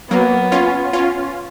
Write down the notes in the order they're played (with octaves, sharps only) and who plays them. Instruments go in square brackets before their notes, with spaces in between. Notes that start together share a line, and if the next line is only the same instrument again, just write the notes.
[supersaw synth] F#3 A#3 [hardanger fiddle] B3
[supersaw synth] C#4 F4
C#4 F4